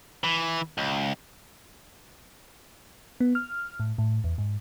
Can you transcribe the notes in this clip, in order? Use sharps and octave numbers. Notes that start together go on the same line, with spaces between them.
E3
C#2
B3
F6
A2
A2
E2
G#2